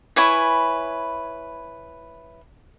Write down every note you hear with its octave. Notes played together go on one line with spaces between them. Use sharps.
E4 B4 C#5 G#5